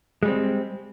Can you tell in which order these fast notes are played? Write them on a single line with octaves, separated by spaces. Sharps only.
G#3 G3 C4